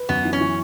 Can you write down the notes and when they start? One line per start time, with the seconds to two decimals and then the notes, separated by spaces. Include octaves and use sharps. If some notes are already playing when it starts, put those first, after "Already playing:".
Already playing: B4
0.09 F#2 B3
0.25 E3
0.33 C#4
0.41 E3